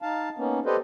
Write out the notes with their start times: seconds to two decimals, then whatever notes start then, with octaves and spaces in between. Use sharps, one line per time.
0.02 D#4 F5 A5
0.38 A#3 B3 C#4 D#4
0.66 G4 A4 B4 C5 D5 D#5